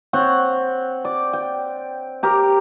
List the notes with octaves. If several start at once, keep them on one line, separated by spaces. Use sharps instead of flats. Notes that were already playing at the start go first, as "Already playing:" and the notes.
C4 C#5 F#5
D5
G5
G4 A#4